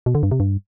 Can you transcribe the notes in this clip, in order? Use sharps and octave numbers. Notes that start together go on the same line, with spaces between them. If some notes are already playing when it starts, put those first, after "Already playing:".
B2
D3
G2
C3
G2